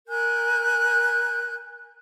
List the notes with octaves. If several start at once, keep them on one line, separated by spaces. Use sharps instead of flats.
A#4 G#5 F#6 G6